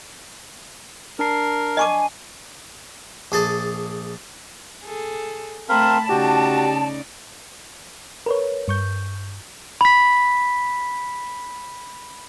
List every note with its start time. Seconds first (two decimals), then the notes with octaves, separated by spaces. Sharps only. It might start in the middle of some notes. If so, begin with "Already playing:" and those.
1.19 D4 A#4 A5 C7
1.77 D#5 G#5 C#6 D6
3.32 A#1 G#4 A4 A5
4.84 G#4 A4
5.69 A3 C4 A#4 F5 A5 B5
6.09 C#3 D#4 F#4 G4 D5
8.26 A#4 B4 C#5
8.68 G2 C#6 G6
9.81 B5 B6